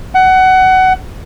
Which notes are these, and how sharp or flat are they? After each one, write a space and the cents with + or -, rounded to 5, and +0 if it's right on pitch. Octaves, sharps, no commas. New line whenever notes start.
F#5 +20